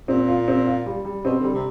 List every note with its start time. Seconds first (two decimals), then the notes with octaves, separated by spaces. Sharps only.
0.08 A#2 C4
0.28 F4
0.48 C4
0.67 F4
0.86 G3
1.05 G3
1.25 B2 C4
1.39 D3 G3
1.54 C3